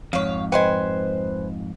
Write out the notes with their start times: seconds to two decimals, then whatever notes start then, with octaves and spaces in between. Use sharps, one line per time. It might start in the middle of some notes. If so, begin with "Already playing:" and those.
0.13 F2 G#2 C#5 F5
0.52 B4 C5 D#5 G5 G#5